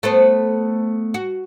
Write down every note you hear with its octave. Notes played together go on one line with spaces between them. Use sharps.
A3 B3 C5
F#4